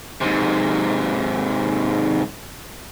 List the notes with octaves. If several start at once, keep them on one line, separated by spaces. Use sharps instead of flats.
G#2 C3